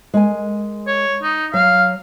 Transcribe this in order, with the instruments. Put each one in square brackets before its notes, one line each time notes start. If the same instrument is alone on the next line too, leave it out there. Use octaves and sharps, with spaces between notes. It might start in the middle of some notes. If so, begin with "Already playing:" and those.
[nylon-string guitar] G#3 A#4 G#5
[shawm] C#5
D#4
[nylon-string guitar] F#3 [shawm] F5